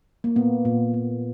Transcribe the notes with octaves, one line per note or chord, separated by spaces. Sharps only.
A#3
A#2 B3
A#2
A#3